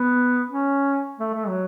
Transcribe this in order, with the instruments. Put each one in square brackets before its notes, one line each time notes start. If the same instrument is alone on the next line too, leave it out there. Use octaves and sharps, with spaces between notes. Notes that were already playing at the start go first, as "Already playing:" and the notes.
Already playing: [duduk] B3
C#4
A3
A3
F#3